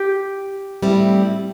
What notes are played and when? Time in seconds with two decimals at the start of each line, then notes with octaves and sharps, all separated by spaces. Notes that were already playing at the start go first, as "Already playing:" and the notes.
Already playing: G4
0.82 A2 G3 C4 E4